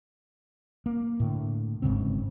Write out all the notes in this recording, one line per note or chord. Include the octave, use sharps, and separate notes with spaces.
A#3
A2 D3
G1 G#2 C#3 C4